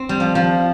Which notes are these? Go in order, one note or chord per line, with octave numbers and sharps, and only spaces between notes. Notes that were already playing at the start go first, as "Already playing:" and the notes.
Already playing: C4
G3
F3
F3